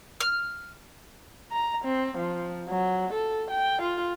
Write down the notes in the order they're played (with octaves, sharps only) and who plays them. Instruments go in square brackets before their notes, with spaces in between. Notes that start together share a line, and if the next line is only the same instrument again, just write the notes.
[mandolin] F6
[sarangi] A#5
C4
F3
F#3
A4
G5
F4